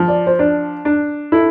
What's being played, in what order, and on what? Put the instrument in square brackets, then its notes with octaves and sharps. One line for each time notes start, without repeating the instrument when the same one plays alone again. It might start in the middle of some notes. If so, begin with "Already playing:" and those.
Already playing: [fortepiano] F3
[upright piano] D5
C5
[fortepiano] D4 [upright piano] D5
[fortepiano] D4
[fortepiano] E4 [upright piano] A4